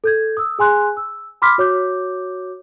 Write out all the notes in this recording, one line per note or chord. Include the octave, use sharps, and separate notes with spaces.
A4 G6 G#6
D#6 E6
G#4 G#5 C6 F#6
E6
B5 C6 D6 F6 B6
F#4 C#5 D6 G6